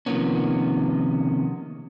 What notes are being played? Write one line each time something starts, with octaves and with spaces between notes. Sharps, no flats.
C3 D#3 F3 A#3 B3 C#4